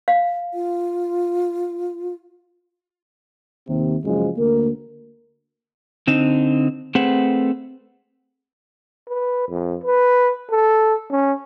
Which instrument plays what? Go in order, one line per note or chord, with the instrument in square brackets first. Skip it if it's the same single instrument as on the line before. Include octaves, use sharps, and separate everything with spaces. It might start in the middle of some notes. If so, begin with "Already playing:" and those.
[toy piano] F5
[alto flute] F4
[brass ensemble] D#2 C3
F#1 F#2 F3 G#3
D2 A#3 A#4
[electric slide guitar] D3 C4 D#4
A3 C4 G#4 B4 C5 F#5
[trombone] B4
F2
B4
A4
C#4